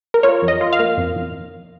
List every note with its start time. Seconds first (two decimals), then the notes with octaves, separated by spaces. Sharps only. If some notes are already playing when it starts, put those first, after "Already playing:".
0.14 A#4
0.23 F4 C#5
0.42 F2
0.48 D#5
0.61 F4
0.73 F5
0.79 A#3
0.98 F2
1.16 F2